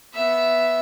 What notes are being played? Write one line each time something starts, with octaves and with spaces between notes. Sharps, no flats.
B3 E5